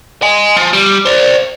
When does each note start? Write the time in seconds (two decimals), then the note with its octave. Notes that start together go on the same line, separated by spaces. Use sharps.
0.22 D#5 G#5
0.56 F3
0.73 G3
1.06 C5 D5